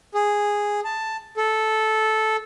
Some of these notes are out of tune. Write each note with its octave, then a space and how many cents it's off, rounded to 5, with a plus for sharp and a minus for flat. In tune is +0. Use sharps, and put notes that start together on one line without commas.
G#4 -5
A5 +5
A4 -10